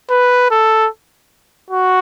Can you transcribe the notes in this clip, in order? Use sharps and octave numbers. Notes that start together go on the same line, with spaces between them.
B4
A4
F#4